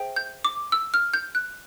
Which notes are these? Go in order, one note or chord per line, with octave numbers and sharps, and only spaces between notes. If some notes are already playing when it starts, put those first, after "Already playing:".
Already playing: G#4 C5 E5 G5
G6
D6
E6
F6
G6
F#6